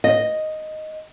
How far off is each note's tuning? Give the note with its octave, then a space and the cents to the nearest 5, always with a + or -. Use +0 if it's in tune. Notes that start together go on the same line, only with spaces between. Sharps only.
D#5 +0